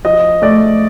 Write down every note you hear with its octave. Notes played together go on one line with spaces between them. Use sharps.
F3 D#5
A3 D5